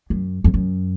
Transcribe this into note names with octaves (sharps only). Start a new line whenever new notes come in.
F#2
F2
F#2